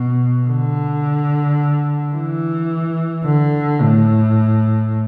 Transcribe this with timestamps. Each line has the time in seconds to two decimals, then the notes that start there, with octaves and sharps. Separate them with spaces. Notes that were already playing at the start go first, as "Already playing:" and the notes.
Already playing: B2
0.47 D3
2.13 E3
3.25 D3
3.81 A2